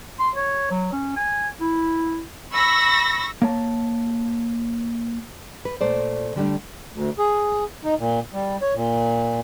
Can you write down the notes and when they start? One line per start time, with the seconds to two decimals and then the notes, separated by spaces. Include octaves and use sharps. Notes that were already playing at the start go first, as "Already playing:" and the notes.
0.19 C6
0.36 C#5
0.71 F#3
0.92 C#4
1.16 G#5
1.61 E4
2.52 B5 C#6 E6 A#6
3.42 A#3 C#5 A5
5.65 B4
5.81 A#2 A3 C5 D5
6.36 D3 G3 A3 D4
6.93 D2
7.19 G#4
7.84 D#4
7.99 A#2
8.33 G3
8.62 C#5
8.75 A#2